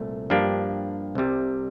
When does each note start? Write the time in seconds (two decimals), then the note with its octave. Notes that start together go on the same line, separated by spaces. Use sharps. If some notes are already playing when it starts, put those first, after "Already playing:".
Already playing: C2 A#2 A3
0.30 G2 F3 A#3 D4 G4
1.15 C2 C3 G3